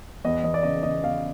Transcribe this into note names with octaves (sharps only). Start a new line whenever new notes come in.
E2 D#5
E2 D#5
D5
C#3 D#5
C#3 D#5
E2 F5